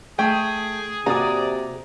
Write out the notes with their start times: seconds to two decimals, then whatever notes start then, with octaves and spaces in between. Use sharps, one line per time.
0.19 A3 G#4 G5
1.06 C3 A#3 F#4 G#4 D5 A#5 D#6